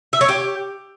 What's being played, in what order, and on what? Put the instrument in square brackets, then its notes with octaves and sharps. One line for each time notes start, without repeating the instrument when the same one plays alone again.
[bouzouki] E5
C#5
G4